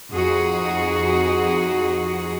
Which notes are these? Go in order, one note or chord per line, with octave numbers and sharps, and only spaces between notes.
F2 D#4 F#4 G#4